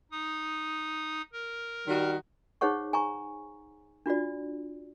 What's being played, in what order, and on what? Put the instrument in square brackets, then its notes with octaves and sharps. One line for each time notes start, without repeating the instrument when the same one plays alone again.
[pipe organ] D#4 D#6
A#4
[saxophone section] D#3 G3 F#4
[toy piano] D#4 G#4 C5 C#5 F#5 C#6
G#5 A#5 C#6
D4 F4 F#4 D5